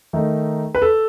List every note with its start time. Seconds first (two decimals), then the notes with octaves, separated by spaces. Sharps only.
0.13 D#3 A3 D#4
0.75 B4
0.82 A4